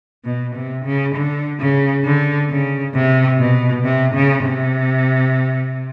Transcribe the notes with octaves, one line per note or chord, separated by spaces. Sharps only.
B2
C3
C#3
D3
C#3
D3
C#3
C3
B2
C3
C#3
C3